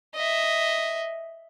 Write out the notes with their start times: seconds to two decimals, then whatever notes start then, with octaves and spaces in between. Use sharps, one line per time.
0.15 D#5 E5